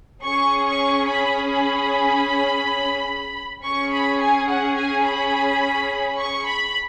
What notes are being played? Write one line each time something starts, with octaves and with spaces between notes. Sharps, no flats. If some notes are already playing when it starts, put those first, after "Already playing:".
C#4 G#4 C#6
C#6
B5
B5
C#4 G#4 C#6
B5
G#5
F#5
G#5
B5
C#6
B5